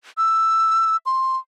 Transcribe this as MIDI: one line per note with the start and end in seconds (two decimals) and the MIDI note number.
0.18 0.97 88
1.06 1.37 84